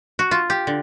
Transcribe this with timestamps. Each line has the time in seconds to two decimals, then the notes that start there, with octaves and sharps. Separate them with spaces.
0.19 F#4
0.31 F4
0.50 G4
0.67 D3